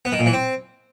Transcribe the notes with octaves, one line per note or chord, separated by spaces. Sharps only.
B3
D#3
A#2
E3
C4